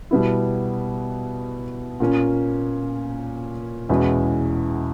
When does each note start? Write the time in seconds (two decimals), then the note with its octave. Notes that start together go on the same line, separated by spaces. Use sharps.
0.11 B2 G3 B3 E4
2.00 A#2 A#3 C#4
3.89 E2 B2 G#3 C#4 E4